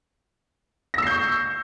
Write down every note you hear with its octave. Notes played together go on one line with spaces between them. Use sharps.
C#6 E6 G6 A#6 C7